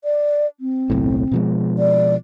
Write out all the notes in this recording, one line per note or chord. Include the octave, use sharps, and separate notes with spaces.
D5
C4
F#1 B1 A2
B2 F3 G#3
D5